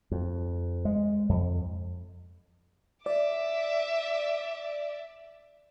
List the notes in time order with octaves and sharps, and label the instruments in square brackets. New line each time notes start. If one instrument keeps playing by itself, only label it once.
[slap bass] F2
G#3
F2
[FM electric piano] D5 [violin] E5 D6